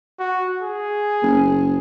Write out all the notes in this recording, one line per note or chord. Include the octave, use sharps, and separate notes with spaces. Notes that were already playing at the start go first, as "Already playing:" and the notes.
F#4
G#4
F#1